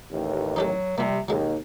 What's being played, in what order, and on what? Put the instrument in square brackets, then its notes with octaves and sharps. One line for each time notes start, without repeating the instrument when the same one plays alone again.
[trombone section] A1 D#2
[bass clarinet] F#3 [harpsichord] D#4 G4 A4
[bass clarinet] C3 [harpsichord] F3 A#3 [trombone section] G3
[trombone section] D#2 [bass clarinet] B2 [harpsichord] F#3 G#3